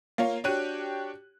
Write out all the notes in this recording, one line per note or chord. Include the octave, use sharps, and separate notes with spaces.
A#3 F4 C#5
D4 F#4 G4 C#5 F#6 D#7